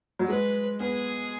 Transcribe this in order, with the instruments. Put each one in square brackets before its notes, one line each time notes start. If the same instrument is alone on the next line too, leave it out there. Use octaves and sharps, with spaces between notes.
[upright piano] F#3
[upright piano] G#3 [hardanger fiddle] B4
[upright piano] B3 [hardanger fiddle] G#4